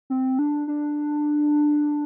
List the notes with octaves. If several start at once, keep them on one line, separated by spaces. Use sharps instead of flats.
C4
D4
D4